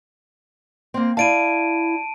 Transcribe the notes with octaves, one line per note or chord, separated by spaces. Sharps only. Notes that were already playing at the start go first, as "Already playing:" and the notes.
A#3 C4
E4 D5 F5 A5 D7 D#7